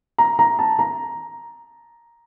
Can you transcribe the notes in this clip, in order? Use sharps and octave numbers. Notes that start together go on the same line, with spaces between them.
A#5
A#5
A5
A#5